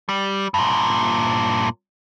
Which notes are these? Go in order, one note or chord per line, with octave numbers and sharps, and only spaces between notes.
G3
G2 A#2